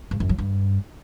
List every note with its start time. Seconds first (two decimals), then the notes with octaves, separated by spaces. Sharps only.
0.11 G2
0.20 F#2
0.29 F#3
0.38 G2